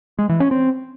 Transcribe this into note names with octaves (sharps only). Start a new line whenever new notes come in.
G#3
E3
C#4
C4